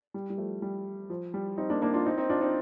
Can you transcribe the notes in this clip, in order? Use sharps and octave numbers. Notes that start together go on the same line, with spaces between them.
G3
G3
F3 A3
G3
F3
G3
C4 D#4
A#3 D4
A#3 D4
D4 F4
C4 D#4
C4 D#4
D4 F4
C4 D#4